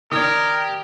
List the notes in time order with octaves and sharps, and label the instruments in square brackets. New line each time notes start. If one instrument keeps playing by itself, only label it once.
[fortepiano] D#3 D4 [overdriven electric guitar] G4 [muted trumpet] A#4 [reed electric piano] D#6 G#6